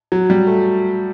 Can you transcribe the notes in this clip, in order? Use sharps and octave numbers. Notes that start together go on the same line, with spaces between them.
F#3
G3
A3